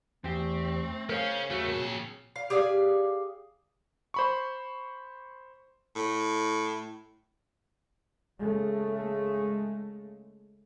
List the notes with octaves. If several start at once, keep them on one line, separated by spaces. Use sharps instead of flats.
E2 A3 C4 G4
C#4 G#4 A#4 C5 C#5 F5
D#2 A3 F#4 A#4
A#2 C4 A5
F5
G4 G#4 D5 F5
C5 B5 C#6
A2
C#3 G#3 A3